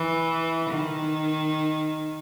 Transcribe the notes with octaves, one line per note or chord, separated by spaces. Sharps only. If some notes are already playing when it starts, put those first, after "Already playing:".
Already playing: E3
D#3